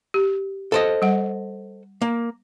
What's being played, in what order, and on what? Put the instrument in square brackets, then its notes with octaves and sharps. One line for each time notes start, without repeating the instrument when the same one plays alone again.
[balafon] G4
[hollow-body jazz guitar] A4 C5 D#5
[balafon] G3 F#5
[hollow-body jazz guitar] A#3